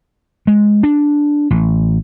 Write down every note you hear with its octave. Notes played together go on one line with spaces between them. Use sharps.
G#3
D4
A1